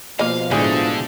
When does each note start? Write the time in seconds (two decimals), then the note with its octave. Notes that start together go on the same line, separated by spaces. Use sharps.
0.19 B2 F3 A#3 D#5 F5
0.51 A2 D3 G#3 D4 G#4 D#6